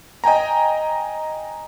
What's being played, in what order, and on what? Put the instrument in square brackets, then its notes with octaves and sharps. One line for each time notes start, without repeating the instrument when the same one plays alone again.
[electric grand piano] D#5 G5 G#5 A#5